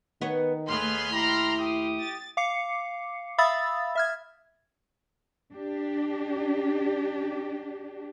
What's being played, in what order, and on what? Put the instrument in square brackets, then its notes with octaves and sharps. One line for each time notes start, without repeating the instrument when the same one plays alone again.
[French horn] D#3 [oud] B3 B4 C#5
[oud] D#2 A3 [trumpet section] B3 G#4 B4 [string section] B5 C6 F6
[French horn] E4 [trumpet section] G4 A#5
[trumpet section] G4 D#6
[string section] A6
[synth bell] F5 D6 C7 C#7
E5 F5 B5 D#6 E6 A6
E5 F6 G#6
[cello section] D4 G4